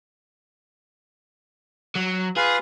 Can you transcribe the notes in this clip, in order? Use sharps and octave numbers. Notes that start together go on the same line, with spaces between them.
F#3
F4 G#4 B4 F5